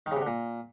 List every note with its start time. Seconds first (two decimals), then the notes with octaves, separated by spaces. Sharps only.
0.06 D#3
0.11 C#3
0.16 C3
0.22 D3
0.27 A#2